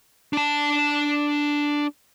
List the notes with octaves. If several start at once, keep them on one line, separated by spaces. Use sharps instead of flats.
D4 A5